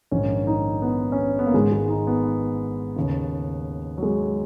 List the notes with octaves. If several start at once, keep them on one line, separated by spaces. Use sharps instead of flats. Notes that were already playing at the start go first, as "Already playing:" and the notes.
A#1 G#2 D#3 C#4
D#4
B3
C#4
B3
B3
A#3
G#1 G#2 D#3 G#3
G#3
D#4
B3
D#2 C#3
F#3
G#3